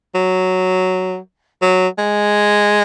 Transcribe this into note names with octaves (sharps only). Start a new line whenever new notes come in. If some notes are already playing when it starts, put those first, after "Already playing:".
F#3
F#3
G#3